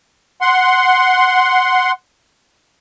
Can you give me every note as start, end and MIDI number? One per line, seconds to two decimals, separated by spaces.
0.41 1.92 78
0.41 1.92 84